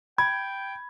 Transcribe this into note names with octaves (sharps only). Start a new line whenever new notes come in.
G5 B5 G#6